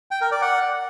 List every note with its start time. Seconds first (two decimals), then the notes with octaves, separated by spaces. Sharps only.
0.11 G5
0.21 A#4
0.32 D5
0.42 F#5